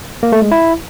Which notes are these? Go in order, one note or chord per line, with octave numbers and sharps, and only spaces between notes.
A#3
A3
G#3
E4